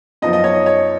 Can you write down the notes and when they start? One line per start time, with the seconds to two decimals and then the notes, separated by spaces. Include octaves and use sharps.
0.22 F#2 F3 B3 D#4 D#5
0.33 D#5
0.44 C#5
0.55 D#5
0.66 C#5